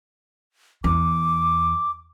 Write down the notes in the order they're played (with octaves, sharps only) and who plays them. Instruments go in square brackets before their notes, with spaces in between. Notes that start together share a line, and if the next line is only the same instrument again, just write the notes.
[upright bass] E2 [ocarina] D6